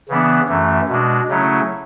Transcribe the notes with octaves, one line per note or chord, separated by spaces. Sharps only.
C#3 E3 B3 D4
F#2 E3 A3
B2 G#3 D4
C#3 F#3 A3 C#4 E4